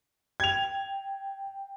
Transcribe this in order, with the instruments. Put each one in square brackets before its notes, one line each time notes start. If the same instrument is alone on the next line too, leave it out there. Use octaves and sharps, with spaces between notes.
[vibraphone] G5 [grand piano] G#6 F7